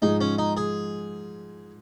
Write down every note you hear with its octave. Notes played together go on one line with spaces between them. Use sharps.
G#2 F3 G#3 D#4
C#4
D#4
G#4